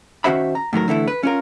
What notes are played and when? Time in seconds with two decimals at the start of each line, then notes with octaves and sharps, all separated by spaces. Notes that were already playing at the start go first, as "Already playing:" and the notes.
0.24 D#3 C#4 F#4 C5 E5 B5
0.55 A#5
0.73 A2 D#3 F#3 A#4
0.88 D3 E3 A3 E4
1.08 B4
1.23 C#4 F4 A#4